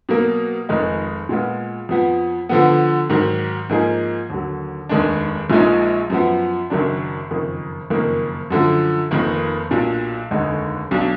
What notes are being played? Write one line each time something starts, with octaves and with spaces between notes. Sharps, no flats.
B2 F#3 A#3
F1 F2 D#3 G#3 D#4
A#2 G#3 B3 F4
F2 F3 B3
D3 F3 B3
G#2 D#3 F#3
G#2 F3 A#3 D#4 G#4
D#2 D3 F#3
F1 D#2 D#3 G#3 D4
A#1 A#2 F3 G#3 D#4
F#2 F3 B3
F#1 F#2 D#3 F#3 D4
F#1 F2 D#3
F#1 F2 D#3 A#3
F#2 D3 F3
F1 F2 D#3 A#3
B1 A#2 F#3 D4
F1 D#2 D3 G#3 D#4
B1 B2 F#3 D4